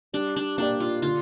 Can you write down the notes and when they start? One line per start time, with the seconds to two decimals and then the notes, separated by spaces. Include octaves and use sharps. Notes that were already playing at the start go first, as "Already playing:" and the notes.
0.13 G3 D4
0.36 D4
0.58 A#3 D4 G4 D5
0.80 F4
1.02 D3 F4